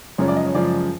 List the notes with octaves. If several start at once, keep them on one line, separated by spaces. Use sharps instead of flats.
F#2 C#3 F3 G#3 C#5
D5
D#5
C#5
F#2 C#3 F3 G#3 D5